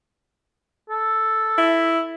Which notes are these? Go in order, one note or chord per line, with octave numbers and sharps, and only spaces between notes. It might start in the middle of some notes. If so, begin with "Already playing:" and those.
A4
E4